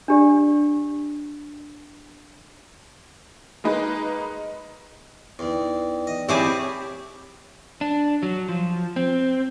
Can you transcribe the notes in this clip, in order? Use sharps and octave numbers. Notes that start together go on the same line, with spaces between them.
D4 G4 D5
G#3 A#3 D#4 B4
E2 D#4 D5 G5
D#5
C4 E4 G4 G#4 C#5 F5 D6
D4
F#3
F3
C4